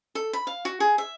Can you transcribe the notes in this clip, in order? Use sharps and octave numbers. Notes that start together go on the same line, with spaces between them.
A4
B5
F5
F#4
G#4
E5